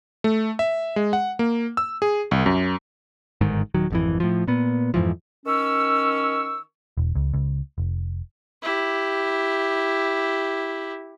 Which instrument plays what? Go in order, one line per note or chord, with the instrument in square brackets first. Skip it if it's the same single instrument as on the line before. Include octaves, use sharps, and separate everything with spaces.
[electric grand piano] A3
E5
G#3
F#5
A#3
E6
G#4
C2
F#2
[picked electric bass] G1 G#2 D#3
D#1 D#3 F#3
G#1 F2 E3
A2 F3
A#2 B3
F2 G#2 E3 F3
[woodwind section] D#3 C#4 C#6 E6
[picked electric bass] E1
C#2
C#2
F1
[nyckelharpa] E4 G4